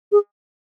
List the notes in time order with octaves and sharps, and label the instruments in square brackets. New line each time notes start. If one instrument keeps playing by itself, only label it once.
[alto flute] G#4